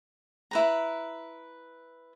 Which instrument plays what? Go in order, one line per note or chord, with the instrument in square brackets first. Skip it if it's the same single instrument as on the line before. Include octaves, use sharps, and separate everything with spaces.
[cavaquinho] E4 B4 A#5